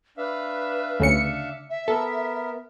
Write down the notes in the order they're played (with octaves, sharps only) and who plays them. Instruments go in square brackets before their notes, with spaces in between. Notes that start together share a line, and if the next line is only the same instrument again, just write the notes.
[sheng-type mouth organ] D4 E5 F5 [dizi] B4
[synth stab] D2 C#3 C#7
[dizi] E5
[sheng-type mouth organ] B3 A#4 [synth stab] A4